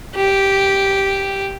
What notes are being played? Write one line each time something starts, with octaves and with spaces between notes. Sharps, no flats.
G4